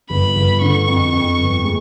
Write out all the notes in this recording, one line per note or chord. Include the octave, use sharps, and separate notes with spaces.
G1 B5
G1
D3 C#6
F2
F2
G1
G#3